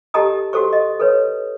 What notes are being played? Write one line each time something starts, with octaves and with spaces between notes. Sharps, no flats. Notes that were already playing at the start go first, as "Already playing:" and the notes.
G4 A4 D#5 A5 A#5 D#6
F#4 G4 A4 C5 C#6
D#5
A4 B4 C#5